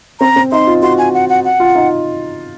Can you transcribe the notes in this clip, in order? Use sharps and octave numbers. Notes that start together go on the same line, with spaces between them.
C4 A#5
C4
D#4 C6
F4
F#4 C6
G#5
F#5
F#5
F#5
F4
D#4